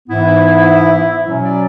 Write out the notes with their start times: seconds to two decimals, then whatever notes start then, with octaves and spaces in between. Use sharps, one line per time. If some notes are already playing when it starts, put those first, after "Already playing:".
0.08 G#2 E3 B3 E4
1.23 B2 F#3 C#4
1.41 D5